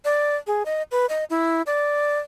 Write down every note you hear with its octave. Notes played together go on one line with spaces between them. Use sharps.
D5
G#4
D#5
B4
D#5
E4
D5